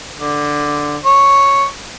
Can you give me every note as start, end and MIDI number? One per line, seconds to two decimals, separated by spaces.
0.16 0.96 50
1.04 1.65 73